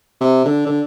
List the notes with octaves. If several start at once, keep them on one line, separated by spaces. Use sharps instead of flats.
C3
D3
D3